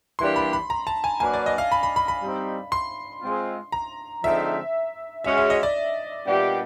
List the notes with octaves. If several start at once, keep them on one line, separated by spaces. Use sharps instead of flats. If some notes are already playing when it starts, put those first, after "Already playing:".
E3 G3 A#3 D4 G4 C6
B5
B5
A#5
A5
G#5
F#3 A#3 D4 F#4 B4 G#5
D5
D#5
F5
B5
B5
B5
B5
G3 C4 D#4
C6
G#3 C4 F4
A#5
D3 F3 G#3 C4 D#4 E5
G#3 C#4 F#4 E5
E5
D#5
D5
A#2 G3 B3 D4 G4